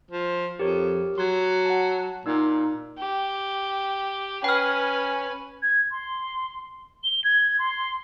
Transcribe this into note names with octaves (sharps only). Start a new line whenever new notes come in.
F3
F2 G4 A#4 C#5
F#3 C6 G#6
F#5 A5
A#2 D#4 E6
G4
C#4 B4 G5 G#5 F6
G#6
C6
G7
G#6
C6